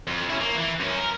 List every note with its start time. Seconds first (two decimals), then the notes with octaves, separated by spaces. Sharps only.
0.07 F2
0.30 C#4 E4
0.41 A#3
0.57 E3
0.80 F#2 C#4
0.98 A#4